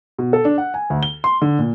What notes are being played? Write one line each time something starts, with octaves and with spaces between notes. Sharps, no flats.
B2
A4
D4
F#5
G#5
D2
G7
C6
D3
A#2